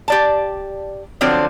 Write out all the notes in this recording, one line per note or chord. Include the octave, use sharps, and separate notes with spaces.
G4 D5 A5
D3 F3 F#3 C4 D4